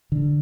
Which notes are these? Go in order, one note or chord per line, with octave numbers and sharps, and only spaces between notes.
D3